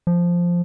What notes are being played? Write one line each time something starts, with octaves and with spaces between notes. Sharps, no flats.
F3